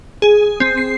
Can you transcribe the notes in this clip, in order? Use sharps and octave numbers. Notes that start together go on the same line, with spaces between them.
G#4
C4
C7